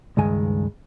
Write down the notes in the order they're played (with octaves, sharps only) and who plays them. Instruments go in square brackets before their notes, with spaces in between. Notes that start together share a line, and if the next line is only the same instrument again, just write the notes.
[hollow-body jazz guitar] C#2 G2 D#3 G#3 G#5